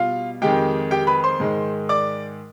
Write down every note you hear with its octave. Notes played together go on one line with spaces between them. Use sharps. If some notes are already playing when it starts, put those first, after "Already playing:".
Already playing: B2 G3 F4 F5
F2 D#3 G#3 G4 G5
G4 G5
B4 B5
C5 C6
G#2 D#3 G#3
D5 D6